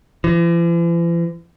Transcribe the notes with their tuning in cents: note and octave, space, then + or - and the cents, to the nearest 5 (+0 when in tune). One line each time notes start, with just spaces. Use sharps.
E3 +45